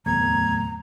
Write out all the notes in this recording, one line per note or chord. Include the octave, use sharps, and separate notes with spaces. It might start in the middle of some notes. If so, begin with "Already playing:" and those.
D1 G1 E2 A3 A#5 G#6